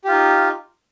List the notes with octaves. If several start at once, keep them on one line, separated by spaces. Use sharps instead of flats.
D#4 F4 G4